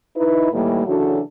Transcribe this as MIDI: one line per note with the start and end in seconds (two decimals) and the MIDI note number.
0.17 0.50 63
0.17 0.50 64
0.17 0.50 71
0.53 0.86 45
0.53 0.86 51
0.53 0.86 52
0.53 0.86 55
0.53 0.86 58
0.86 1.20 49
0.86 1.20 52
0.86 1.20 54
0.86 1.20 62
0.86 1.20 66
0.86 1.20 69